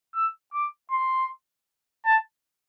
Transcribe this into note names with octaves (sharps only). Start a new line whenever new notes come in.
E6
D6
C6
A5